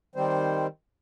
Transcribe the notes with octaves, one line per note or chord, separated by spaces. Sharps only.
D#3 G3 C4 C5